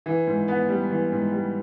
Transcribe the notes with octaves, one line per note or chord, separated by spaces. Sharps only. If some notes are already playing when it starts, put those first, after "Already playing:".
E3
G#2
B3
G3
E3
G#2
G3